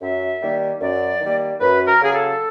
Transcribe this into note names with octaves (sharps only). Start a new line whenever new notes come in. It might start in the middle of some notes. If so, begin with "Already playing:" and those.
F#2 E5
D#3 G3 A#3
F#2 D5
D#3 G3 A#3
F#2 B4
A#4
C#3 F#3 A#3 G#4
A4